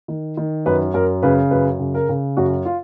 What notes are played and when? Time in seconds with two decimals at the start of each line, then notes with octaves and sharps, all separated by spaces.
0.08 D#3
0.37 D#3
0.66 F#2 B4
0.94 F#2 A#4
1.22 C#3 B4
1.51 F#2 B4
1.80 C#3
1.94 A#4
2.09 C#3
2.37 F#2 F#4
2.65 F4